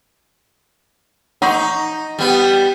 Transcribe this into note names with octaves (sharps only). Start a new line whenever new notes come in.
D#4 F#5 C6 C#6
G3 B3